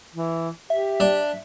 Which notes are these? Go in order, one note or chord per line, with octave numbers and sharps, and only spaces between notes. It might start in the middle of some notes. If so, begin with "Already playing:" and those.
E3
G4 E5
D4